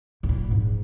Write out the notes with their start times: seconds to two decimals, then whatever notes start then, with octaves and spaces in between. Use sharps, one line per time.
0.23 C3
0.29 A#2
0.51 G#2